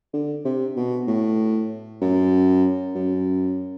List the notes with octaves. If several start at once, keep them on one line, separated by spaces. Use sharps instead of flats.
D3
C3
B2
A2
F#2
F#2